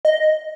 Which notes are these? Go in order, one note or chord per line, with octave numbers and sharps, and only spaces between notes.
D#5